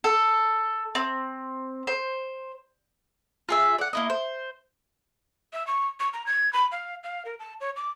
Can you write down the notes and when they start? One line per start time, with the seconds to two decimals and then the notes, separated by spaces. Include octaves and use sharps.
0.04 A4
0.95 C4
1.87 C5
3.49 F4 G#4 E5
3.78 D5 F#5
3.93 A#3 E4 D#5
4.10 C5
5.53 E5
5.67 C#6
6.00 C#6
6.13 A#5
6.26 G#6
6.53 B5
6.72 F5
7.03 F5
7.25 A#4
7.39 A5
7.60 C#5
7.76 D6